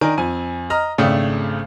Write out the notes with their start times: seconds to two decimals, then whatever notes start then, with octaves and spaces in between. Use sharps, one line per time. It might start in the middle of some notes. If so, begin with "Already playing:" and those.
0.01 D#3 D4 A#4 D#5 G#5
0.18 F2 G#5
0.70 D#5 A#5 F6
0.98 G#1 C#3 A3 D4 G5 D#6